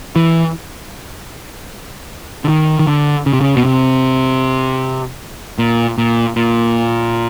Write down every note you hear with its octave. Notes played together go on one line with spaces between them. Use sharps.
E3
D3
D#3
D#3
D3
C#3
C3
C#3
B2
C3
A#2
A#2
A#2